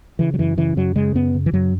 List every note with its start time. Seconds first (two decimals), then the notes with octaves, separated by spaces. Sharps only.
0.19 C#3 E3
0.34 F#3
0.38 F#2 E3
0.57 C#3 E3
0.76 F#2 F#3
0.95 C#3 G#3
1.14 F#2 B3
1.34 C#3
1.46 E3
1.53 F#2 F#3